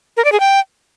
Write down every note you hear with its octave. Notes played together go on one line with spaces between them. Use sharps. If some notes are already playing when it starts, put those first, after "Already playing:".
A#4
D5
G#4
G5